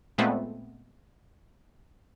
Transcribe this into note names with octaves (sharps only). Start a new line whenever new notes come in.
A#2 G#3 A3 B3 C4